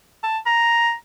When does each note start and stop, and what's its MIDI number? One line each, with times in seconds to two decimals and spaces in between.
0.24 0.39 81
0.46 0.94 82